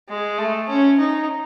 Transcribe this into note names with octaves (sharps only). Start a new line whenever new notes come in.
G#3
A3
C#4
D#4